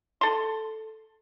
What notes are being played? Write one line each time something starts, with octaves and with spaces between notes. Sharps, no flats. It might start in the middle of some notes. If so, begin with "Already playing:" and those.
A4 C6